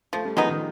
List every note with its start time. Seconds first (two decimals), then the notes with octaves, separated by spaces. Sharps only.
0.13 F3 A3
0.25 G3
0.37 F3 G#3 B3 D#4
0.49 D#3